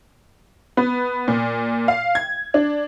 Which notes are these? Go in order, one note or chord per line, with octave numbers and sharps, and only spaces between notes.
B3
A#2
F5
G#6
D4